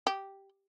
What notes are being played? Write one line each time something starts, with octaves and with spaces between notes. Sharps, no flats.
G4